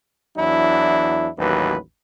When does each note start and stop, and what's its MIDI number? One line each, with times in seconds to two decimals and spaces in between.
0.36 1.27 40
0.36 1.27 54
0.36 1.27 62
0.36 1.27 64
1.37 1.76 33
1.37 1.76 39
1.37 1.76 54
1.37 1.76 71